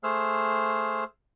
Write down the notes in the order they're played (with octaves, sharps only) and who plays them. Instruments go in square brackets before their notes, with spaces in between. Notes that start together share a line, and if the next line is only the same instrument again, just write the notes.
[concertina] A3 G#4 C5 E6 F6